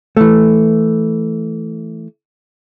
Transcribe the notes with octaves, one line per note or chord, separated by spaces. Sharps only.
E3 A3